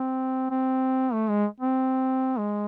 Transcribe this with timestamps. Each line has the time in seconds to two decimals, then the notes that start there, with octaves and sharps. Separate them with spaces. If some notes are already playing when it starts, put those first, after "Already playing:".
Already playing: C4
0.51 C4
1.13 A3
1.29 G#3
1.60 C4
2.38 G#3